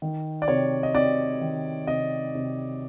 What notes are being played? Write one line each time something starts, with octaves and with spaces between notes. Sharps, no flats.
D#3
D5
C3 C#5
D#5
C3 D5
D#3
C3 D#5
C3